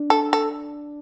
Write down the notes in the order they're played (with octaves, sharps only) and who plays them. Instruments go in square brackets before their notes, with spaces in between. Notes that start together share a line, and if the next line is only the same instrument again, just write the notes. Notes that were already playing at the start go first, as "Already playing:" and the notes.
Already playing: [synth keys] D4
[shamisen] A4
A4